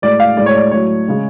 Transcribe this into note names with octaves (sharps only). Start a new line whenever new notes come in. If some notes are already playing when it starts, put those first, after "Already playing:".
A2 G#3 D5
F5
A2 G#3 D5
C#5
D5
A2 F#3 C#5
C#3 G#3